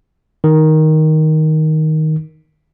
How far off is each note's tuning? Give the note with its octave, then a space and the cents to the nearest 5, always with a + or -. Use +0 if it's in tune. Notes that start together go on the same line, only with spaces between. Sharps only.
D#3 +5